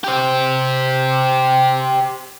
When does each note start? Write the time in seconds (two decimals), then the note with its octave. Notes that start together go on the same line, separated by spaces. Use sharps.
0.04 G4 C5